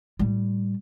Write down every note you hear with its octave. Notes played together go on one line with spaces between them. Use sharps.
A2 G3